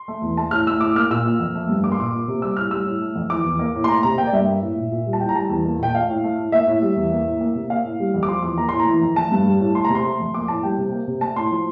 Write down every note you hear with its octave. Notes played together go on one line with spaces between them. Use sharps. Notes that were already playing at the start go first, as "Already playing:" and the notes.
Already playing: C6
A3
E2
A3 A5
A2 F6
A3 E6
A2 D6
A#3 F6
A#2 E6
A#3
F2
A3
G2
A#3 D6
C6
A#2 D6
A#3
C3
G3 E6
A2 F6
G3 E6
A2
A3
F2
E3 D6
E2
A#3
A2
C6
A3 A#5
C3 A#5
A#3 G5
D5
G2 E5
A#3
A2
A#2
A#2
G3
A5
A2 G5
A#5
G3 A5
E2
A#3
A#2 G5
A3 F5
A2
A3
A2
A#3 E5
A2
G3
E2
A#3
A2
A#3
C3
A#3 F5
A2
G3
F2
D6
F3 C6
E2 D6
A#3 A#5
A2 C6
A#5
E3
F2
A3 A5
G2
G3
A2
A3 C6
A#5
C3
C6
A3
F2
A#3 D6
A2 A5
G3 G5
C3
A#3
C3
A3 A5
A2 C6
F3